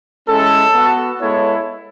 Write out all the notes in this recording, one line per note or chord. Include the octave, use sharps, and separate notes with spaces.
G#3 C#4 E4 A4
B3 F#4
G#3 B3 E4 A4 C#5